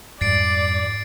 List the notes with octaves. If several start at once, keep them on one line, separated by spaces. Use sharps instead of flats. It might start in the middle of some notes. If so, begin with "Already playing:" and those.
F2 G#2 G3 D5 A6 C7 D7